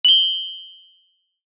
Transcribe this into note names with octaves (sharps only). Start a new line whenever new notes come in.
F#7 G7